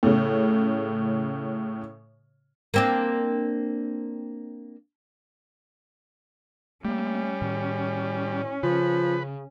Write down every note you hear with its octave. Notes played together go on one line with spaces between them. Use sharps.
A2 C#3
A#3 C4 D4
G3 A3 A#3 C#4
A2 D#3
C#3 F3 B4